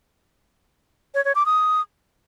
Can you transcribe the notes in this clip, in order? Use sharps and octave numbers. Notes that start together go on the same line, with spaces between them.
C#5
C#5
D6
D#6